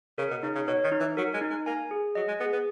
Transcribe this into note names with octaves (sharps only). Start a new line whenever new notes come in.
C#3 A#4
B2
C#3 D#4
C#3
B2 C#5
D#3
D#4
E3
F#3 A#4
G#3
D#4
G#3
A#3 G#5
G#4
F#3 D#5
G#3
B3 G#4
B3